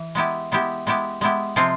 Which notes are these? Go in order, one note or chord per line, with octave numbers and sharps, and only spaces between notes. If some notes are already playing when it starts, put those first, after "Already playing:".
Already playing: E3
G#3 B3 E4 G4
G#3 B3 E4 G4
G#3 B3 E4 G4
G#3 B3 E4 G4
C3 F3 G#3 C4 F4